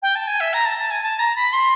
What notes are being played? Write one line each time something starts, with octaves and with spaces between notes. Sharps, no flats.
G5
A5
G#5
E5
A#5
A5
A5
G#5
A5
A#5
B5
C6